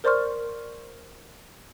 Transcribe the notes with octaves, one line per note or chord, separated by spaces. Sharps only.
A#4 C5 D5 C6 C#6 F6